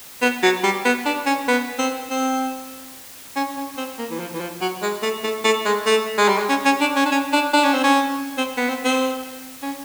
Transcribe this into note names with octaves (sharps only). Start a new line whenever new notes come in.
B3
F#3
G3
B3
D4
C#4
B3
C4
C4
C#4
C#4
C4
A#3
E3
F3
E3
F3
F#3
G#3
A3
A3
A3
G#3
A3
G#3
G3
G#3
C#4
C#4
D4
C#4
D4
C#4
D4
D4
C#4
C4
C#4
C4
B3
C4
C4
C#4